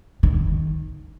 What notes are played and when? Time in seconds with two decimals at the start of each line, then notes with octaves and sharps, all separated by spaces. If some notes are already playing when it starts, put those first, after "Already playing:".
0.23 D#3